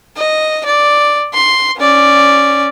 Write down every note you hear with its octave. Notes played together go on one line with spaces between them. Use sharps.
D#5
D5
C6
C#4 D5